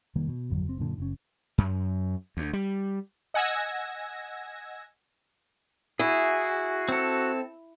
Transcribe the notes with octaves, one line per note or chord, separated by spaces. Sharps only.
F1 D#3 G3 A#3
B2
G#1 F2 D3 F#3
F#1 C4
F#2 A#2 D3
F#1 C#4
F#2
D2
G3
D#5 F#5 G#5 E6 G#6 A#6
E4 F#4 G#4
C4 A4